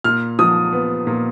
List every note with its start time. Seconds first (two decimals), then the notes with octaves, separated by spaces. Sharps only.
0.04 A#2 F6
0.39 F3 D#6
0.73 B3
1.07 A#2